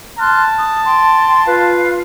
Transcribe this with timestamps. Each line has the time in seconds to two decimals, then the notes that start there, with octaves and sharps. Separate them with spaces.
0.19 A5 C6 F6 F#6
0.57 D#6
0.86 G5 C6
1.45 F4 B4 F5